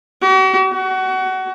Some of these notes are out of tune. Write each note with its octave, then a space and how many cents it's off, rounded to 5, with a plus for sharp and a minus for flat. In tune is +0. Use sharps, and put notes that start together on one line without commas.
F#4 +45
F#4 +25